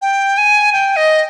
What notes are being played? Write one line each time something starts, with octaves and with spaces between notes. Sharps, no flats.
G5
G#5
G5
D#5